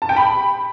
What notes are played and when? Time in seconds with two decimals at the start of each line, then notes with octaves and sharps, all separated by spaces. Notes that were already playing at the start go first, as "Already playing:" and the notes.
0.02 A5
0.09 G5
0.16 B5